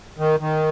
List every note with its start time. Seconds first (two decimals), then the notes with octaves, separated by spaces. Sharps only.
0.18 D#3
0.40 D#3